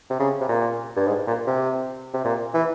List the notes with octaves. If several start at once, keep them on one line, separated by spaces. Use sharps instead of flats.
C3
C#3
C3
A#2
G2
G#2
A#2
C3
C3
A#2
E3